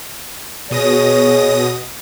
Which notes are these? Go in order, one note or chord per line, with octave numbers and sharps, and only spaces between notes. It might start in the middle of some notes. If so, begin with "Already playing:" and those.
B2 G#4 C#5 D#6 A#6